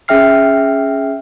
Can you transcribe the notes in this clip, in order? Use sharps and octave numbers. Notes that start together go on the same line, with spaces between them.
C#4 G#4 E5 G5 F6 C7